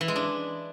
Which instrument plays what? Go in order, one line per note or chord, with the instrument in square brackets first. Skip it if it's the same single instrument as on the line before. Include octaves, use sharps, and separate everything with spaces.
[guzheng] E3
G#3
D4